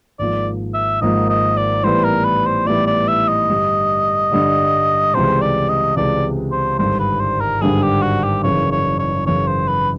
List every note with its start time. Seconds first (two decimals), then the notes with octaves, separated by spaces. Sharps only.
0.19 G#1 G#2 F3 A#3 D5
0.74 E5
1.01 G#1 G#2 F3 A#3 D#5
1.29 D#5
1.57 D5
1.83 A2 E3 G3 B3 E4 C5
2.05 A#4
2.25 B4
2.46 C5
2.66 A2 E3 G3 B3 E4 D5
2.87 D5
3.08 E5
3.28 D#5
3.49 G2 D3 G3
4.31 G2 D3 G3
5.14 C#2 C3 E3 G#3 C5
5.41 D5
5.69 D#5
5.96 C#2 C3 E3 G#3 D5
6.51 C5
6.79 G#1 G2 D3 G3 C5
6.99 B4
7.20 C5
7.41 A#4
7.61 G#1 G2 D3 G3 G#4
7.82 G4
8.03 F#4
8.24 G4
8.44 F#1 F#2 C#3 E3 C#5
8.71 C#5
8.99 C#5
9.27 F#1 F#2 C#3 E3 C#5
9.47 C5
9.68 B4